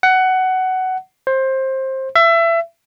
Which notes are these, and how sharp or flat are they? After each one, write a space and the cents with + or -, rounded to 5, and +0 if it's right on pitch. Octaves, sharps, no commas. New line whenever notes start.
F#5 +15
C5 +20
E5 +25